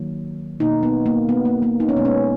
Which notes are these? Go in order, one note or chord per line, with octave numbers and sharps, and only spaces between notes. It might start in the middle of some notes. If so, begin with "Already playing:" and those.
Already playing: D#3 F#3 A#3
B2 A#3 D#4
B3
A#3
B3
A#3
A#3
D#4
C#4
B2 G#3 B3
C#4